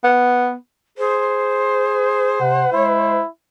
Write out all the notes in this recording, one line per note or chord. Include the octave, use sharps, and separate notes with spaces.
B3
G#4 C5
C3 F#5
G#3 E4